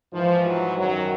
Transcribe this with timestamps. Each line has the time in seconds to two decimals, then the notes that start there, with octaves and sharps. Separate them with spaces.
0.13 G#2 E3 F3
0.46 F#3
0.78 F#2 D#3 F#3